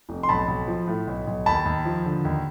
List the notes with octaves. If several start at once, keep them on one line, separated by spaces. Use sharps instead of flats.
F1
C6
B1 A5 B5
B1
F3
A2
B1
B1
D#2 A5 B5
D#2
F3
D3
D#2